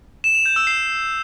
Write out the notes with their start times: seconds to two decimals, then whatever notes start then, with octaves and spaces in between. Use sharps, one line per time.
0.24 E7
0.35 F7
0.46 G6
0.56 E6
0.67 C7